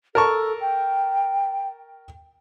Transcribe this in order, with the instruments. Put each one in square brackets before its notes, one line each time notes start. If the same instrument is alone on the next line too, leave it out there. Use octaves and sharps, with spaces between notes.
[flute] A4 [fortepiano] A#4 A5 C#6
[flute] G5